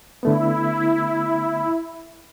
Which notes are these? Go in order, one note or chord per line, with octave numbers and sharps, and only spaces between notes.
D3 A3 B3 E4